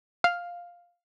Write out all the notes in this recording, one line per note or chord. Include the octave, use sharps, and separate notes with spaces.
F5